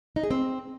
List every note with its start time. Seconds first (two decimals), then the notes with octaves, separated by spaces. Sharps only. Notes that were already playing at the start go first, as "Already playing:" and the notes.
0.16 D#4
0.23 G#4
0.31 C4